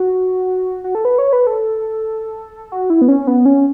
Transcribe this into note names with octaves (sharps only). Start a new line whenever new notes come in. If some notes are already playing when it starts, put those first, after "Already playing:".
Already playing: F#4
F#4
A4
B4
C#5
B4
A4
F#4
E4
B3
C#4
B3
C#4